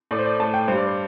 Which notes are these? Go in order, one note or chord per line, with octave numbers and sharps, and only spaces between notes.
A2 A3 D5
C5
D5
A2 A3 A5
G5
G2 G3 C5
D5
C5